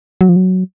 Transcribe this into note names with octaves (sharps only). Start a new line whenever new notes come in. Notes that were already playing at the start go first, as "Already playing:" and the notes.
F#3
F3
F#3